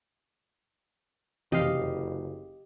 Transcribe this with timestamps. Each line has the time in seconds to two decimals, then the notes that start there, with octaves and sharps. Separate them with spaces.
1.52 F#1 F2 C3 E3 G4 D#5 F5